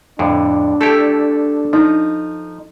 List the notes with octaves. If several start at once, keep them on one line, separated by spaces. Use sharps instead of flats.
F2 A2 D3 D4
A3 E4 G4 A4
F3 D#4